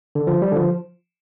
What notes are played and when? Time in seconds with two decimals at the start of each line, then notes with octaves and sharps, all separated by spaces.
0.15 D3
0.27 F3
0.42 G3
0.52 D3
0.56 F3